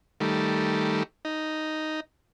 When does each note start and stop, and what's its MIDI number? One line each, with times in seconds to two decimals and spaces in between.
0.20 1.03 51
0.20 1.03 55
0.20 1.03 57
1.25 2.00 63